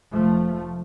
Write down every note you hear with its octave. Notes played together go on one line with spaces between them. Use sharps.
F1 F3 A3